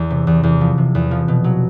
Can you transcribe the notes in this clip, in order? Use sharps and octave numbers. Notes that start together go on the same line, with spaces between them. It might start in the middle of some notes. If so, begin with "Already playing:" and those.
Already playing: E2
C3
E2
E2
F3
C3
E2
F3
B2
F#3